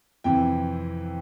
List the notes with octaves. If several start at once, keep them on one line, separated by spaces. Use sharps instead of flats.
F2 C3 E3 G5